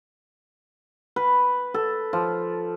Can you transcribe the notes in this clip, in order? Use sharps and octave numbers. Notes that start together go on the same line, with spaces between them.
B4
A4
F3